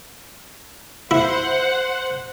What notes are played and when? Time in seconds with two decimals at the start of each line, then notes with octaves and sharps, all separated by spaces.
1.11 E4 C5 F#5